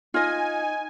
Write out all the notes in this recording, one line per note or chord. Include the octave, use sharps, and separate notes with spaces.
D#4 F4 D#5 G#5